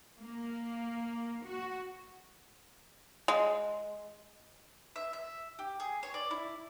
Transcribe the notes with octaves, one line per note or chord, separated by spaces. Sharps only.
A#3
F#4
G#3
E5
E5
G4
G#4
C#5
D5
E4